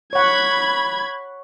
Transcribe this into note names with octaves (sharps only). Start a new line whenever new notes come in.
C#5 F#5 B5 G#6